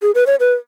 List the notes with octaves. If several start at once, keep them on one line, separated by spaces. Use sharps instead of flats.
G#4
B4
C#5
B4